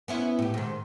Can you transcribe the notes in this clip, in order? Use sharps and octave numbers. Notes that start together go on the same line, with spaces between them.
B3 C#4 E4
A2 G4
G#2 D#3